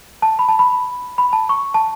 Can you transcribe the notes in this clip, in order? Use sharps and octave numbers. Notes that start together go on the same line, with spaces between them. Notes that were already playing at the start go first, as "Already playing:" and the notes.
A5
B5
A5
B5
B5
A5
C#6
A5